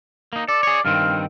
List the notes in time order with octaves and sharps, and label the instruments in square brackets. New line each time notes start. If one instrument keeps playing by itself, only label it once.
[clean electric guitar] A#3 D#4
[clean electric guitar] A4 [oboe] D5
[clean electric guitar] G#4 C#5
[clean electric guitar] G2 D#3 C4 [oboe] F5